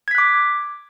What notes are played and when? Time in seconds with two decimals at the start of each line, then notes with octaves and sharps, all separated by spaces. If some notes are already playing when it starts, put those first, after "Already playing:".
0.08 G#6
0.11 B6
0.15 F#6
0.18 D6